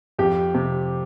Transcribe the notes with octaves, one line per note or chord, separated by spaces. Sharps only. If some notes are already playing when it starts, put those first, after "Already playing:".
F2 G4
C3